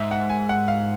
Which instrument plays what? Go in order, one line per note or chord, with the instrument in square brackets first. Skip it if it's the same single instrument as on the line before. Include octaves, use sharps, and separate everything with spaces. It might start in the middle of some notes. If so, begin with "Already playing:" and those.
Already playing: [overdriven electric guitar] G#2 [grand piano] E5
[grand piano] F#5
G#5
F#5
F5